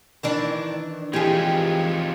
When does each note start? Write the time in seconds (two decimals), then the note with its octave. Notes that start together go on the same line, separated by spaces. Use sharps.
0.23 D#3 E3 D4
1.13 E3 C4 D#4 F4 G4 G#4 G#6